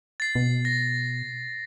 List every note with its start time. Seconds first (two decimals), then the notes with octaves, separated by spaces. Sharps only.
0.20 A6 C7
0.35 B2
0.65 A#6